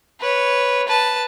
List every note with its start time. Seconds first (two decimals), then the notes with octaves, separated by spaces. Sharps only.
0.21 B4 C#5
0.88 B4 A5